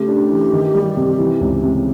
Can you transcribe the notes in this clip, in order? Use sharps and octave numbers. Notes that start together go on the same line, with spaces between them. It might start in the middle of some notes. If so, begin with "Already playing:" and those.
Already playing: C#3 A3 G4
D4
E3
D#3
G3
C3
E3
C#2
C3